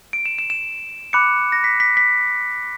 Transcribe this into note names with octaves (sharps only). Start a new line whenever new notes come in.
D7
E7
E7
E7
B5 D6 F#6 C#7
A#6
B6
B6
B6